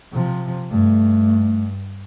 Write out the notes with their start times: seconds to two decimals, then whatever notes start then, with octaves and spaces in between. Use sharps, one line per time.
0.12 C3 F3
0.71 G2 A3